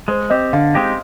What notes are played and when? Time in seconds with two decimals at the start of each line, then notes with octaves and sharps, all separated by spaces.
0.08 G#3 C5
0.30 C4 G4 D#5
0.53 D3 F5
0.75 G#3 C4 D#4 G4